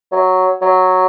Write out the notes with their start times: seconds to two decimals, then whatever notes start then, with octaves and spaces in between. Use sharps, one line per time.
0.12 F#3
0.61 F#3